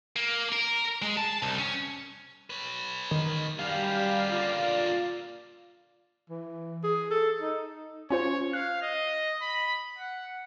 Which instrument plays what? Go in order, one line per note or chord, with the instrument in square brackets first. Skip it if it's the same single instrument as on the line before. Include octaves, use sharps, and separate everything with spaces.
[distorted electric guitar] A#3
A#4
G#3
A5
C2
C#4
B4 C#5
[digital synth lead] D#3
[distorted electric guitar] F#2 B3 [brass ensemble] G3 G4 [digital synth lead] F5
[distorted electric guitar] D3 A#3 [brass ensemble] F4 D5
[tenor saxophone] E3
G#4
A4
D#4
[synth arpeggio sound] C#4 F4 C5 [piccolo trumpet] C#5
[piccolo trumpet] F5 [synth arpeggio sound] F#6
[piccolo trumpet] D#5
B5
F#5